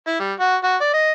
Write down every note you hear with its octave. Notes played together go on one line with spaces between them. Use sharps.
E4
G3
F#4
F#4
D5
D#5